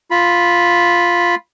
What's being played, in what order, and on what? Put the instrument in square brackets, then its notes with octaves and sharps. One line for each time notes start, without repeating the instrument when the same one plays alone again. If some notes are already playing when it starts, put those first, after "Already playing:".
[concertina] F4 B5